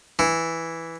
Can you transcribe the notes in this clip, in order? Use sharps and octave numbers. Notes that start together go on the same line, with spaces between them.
E3